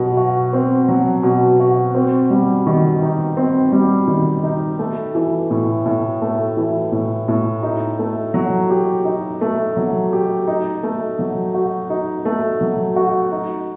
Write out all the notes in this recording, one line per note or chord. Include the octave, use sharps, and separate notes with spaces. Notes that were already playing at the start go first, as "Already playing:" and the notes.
Already playing: B2 F#3
F#4
C4
F#3
B2
F#4
C4
G3
D#3
D#4
C4
G3
D#3
D#4
A3
E3
A2
A2
A3
E3
A2
A2
D#4
A3
F#3
G4
D#4
A3
F#3
G4
D#4
A3
F#3
F#4
D#4
A3
F#3
F#4
D#4